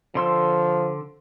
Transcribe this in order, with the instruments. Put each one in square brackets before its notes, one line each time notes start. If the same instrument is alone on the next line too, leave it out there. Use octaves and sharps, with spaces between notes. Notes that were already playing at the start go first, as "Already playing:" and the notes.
[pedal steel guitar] D3 C6 E6 [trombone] F3